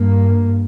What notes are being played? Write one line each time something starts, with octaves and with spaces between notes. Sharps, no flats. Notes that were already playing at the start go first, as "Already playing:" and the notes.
Already playing: G2 A#3